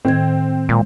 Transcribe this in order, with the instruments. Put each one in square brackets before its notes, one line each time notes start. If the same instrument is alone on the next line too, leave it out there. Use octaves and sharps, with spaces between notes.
[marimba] A2 D#3 G#6 [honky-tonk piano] C4
[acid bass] A#2 [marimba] G#3